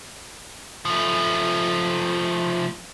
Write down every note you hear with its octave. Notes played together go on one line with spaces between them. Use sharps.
F3 A3